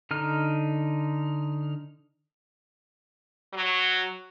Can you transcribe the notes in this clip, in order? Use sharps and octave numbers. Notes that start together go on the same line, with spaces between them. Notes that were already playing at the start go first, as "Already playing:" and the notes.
D3 D#4 F6
F#3